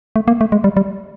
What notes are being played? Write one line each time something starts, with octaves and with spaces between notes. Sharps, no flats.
A3
A#3
A3
G#3
G3
G3